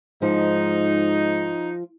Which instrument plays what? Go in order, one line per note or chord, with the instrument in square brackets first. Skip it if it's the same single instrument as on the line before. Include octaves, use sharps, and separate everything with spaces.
[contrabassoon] G#2 [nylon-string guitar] F3 [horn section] D#4